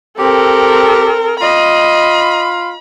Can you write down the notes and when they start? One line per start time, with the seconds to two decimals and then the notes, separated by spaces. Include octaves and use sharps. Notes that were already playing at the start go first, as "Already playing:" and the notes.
0.19 C4 G4 A4 A#4
1.41 F4 D#5 B5